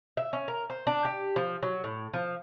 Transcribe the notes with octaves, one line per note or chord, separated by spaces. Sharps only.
E5
C#4
A#4
C5
D4
G4
F3
F#3
A2
F3